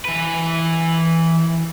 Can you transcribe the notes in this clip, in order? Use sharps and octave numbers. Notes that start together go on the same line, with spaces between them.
E3 B4